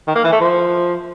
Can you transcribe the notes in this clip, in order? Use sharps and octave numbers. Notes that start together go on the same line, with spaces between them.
D#3
A#3
E3
A3
F3